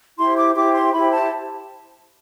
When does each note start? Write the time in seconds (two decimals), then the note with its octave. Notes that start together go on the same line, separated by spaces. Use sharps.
0.18 E4 G4 C5 C6
0.37 D6
0.55 E4 G4 C5 D6
0.74 C6
0.93 E4 G4 C5 B5
1.12 A5